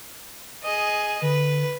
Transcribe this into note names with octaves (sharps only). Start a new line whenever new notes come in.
G#4 D#5
D3 B4